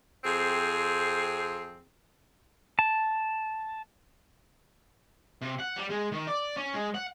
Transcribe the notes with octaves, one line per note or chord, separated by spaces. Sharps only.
F2 C4 G#4
A5
C3
F#5
G3
G#3
D#3
D5
C#4
G#3
F#5